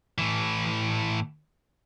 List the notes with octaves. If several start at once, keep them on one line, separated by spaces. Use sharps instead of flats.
A2 E3